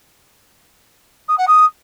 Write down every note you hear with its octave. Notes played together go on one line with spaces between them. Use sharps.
D#6
F#5
D#6